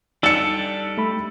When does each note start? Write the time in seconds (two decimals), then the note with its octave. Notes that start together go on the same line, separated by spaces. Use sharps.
0.23 G3 D4 D#4 A4 E6 C#7
0.98 A3 B5